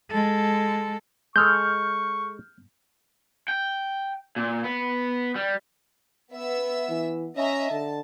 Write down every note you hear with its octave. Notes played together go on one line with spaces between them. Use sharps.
G#3 A4
G#3 A4 C#6 F6 G6
G5
A#2
B3
G3
B3 E5 E6
E3
C#4 D#5 E5 A#5
D3 A5